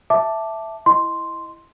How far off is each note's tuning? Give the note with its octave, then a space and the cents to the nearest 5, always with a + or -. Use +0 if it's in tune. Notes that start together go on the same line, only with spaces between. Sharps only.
E5 +0 A5 +0 D6 +0
E4 +0 D#5 +0 C6 +0